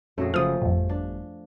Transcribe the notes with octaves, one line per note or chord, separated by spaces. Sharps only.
A#1 F2 A3 C#4 F#4 G#4
F#1 F#2 C#3 F3 F5 D#6
G1 F2 A2
D4